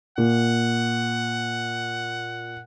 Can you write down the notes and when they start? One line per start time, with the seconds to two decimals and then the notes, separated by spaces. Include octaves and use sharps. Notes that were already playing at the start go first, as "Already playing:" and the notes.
0.18 A#2 F#5